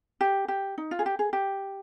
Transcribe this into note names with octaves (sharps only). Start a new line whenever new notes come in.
G4
G4
D#4
F4
G#4
G4
G#4
G4